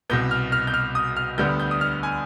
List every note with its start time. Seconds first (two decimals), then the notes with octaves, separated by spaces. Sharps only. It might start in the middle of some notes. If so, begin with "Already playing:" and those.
0.10 C2 B2 B3 G6
0.31 F6
0.52 F6
0.67 G6
0.74 F6
0.95 D#6
1.16 F6
1.38 D2 D3 G3 B3 G6
1.60 G6
1.71 D#6
1.81 F6
2.03 G#5